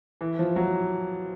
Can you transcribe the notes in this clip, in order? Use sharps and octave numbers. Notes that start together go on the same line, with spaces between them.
E3
F3
F#3